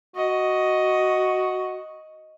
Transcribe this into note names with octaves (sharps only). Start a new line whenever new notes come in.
F#4 D#5